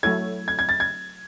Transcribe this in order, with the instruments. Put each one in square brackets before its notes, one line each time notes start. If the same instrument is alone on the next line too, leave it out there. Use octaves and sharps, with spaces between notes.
[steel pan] F#3 A3 E4 A4 C#5 [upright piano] G#6
[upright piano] G#6
G#6
A6
G#6